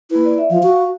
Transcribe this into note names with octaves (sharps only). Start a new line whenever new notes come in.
A#3 E4 B4
D5
E5
F3 F5
F#4